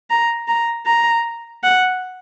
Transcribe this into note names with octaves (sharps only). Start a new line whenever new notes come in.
A#5
A#5
A#5
F#5